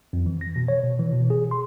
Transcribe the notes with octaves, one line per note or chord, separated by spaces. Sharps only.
F2
E3
A#6
B2
C#5
B2
E3
B2
G#4
C6